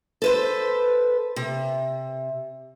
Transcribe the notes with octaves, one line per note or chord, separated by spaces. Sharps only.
A4 B4 C5
C3